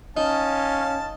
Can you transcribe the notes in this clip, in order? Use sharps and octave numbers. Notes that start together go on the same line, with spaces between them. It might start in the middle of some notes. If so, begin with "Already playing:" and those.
C#4 D#4 F5 A5